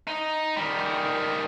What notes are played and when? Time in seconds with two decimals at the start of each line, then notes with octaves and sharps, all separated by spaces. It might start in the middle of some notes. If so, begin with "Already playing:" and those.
0.08 D#4
0.56 D#3 G3